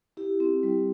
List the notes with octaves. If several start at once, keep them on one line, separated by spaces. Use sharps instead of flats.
E4 G4
C4
G3